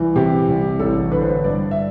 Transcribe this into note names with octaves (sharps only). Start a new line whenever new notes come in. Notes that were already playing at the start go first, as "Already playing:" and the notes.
Already playing: C2 E3
C3 G4
C2
A1 A4
D3 B4
C5
B4
G2 D5
E5